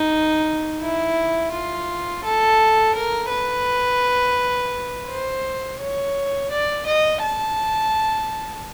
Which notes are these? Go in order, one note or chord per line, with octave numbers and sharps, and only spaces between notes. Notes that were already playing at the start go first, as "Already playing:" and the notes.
Already playing: D#4
E4
F4
A4
A#4
B4
C5
C#5
D5
D#5
A5